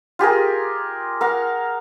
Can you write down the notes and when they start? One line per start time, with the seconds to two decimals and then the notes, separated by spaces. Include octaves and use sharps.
0.19 F4 G4 G#4 A#4
1.21 A#4 F5 F#5